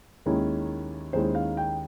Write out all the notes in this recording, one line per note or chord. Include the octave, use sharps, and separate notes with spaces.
D#2 D#3 G#3 C#4 E4
D#2 D#3 G#3 C#4 E4 C5
F5
G5